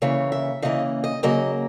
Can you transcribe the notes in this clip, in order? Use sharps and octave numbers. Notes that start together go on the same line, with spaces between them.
C#3 E3 A#3 C#5
E5
C#3 E3 A#3 D#5
D#5
C#3 F#3 A#3 D#5